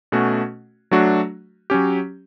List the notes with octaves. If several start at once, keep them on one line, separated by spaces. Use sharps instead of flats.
B2 A3 C#4 F#4
F#3 A3 D4 F#4
F#3 C#4 G4